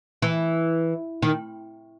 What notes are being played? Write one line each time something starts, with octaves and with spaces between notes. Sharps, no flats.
E3
D#3